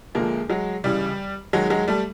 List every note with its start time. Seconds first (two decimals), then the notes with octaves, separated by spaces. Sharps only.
0.15 D2 D3 F3 G#3 A#3
0.50 F#3 G#3
0.84 C#2 C#3 E3 G3
1.53 D#2 D#3 F#3 G#3
1.70 F#3 G#3
1.88 G3 A3